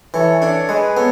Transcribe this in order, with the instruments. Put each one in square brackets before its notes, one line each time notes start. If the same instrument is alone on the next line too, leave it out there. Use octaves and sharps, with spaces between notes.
[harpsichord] E3 [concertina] A4 C#5
[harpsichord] D4 [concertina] A4 C#5
[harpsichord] G#3 [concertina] G#4 B4
[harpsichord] B3 [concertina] A4 C#5